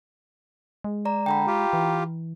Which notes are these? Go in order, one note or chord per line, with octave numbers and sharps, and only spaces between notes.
G#3
D5 A#5
D3 G5 A#5 B5
F4 G4
E3